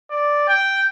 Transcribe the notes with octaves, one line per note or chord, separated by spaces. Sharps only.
D5
G5